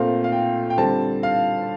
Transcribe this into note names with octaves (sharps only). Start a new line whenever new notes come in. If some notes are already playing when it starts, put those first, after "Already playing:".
Already playing: A#2 A3 C4 F5
F5
G5
G5
D3 G3 C4 A5
F5